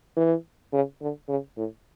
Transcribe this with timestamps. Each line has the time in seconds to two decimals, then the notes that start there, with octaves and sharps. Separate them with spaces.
0.17 E3
0.73 C#3
1.01 D3
1.28 C#3
1.57 A2